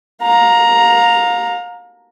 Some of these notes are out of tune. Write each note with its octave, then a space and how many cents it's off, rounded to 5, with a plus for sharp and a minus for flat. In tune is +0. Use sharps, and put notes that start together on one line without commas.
F5 +30 A#5 +0